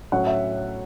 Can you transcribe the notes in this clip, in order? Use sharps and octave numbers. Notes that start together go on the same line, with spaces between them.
A2 F#3 C#4 F#5
E5